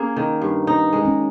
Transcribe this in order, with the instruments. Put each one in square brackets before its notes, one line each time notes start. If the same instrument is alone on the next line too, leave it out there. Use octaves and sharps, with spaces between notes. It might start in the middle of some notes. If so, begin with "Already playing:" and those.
Already playing: [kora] A#3 G#4 [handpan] C#4
[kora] D#3
G2
D#4
G#3
[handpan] C#4